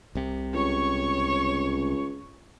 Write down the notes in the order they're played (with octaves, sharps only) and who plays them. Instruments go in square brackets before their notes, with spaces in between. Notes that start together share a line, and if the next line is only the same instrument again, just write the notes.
[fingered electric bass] C2 C3
[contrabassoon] C#2 [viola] C#5 C#6